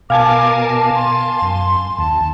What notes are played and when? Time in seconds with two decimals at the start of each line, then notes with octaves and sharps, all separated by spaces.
0.10 B2 A#4 F5 G#5 A5 D6
0.95 C6 A6
1.42 F#2
1.98 D#2 A5